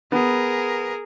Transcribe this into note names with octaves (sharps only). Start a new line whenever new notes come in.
B3 G#4 A#4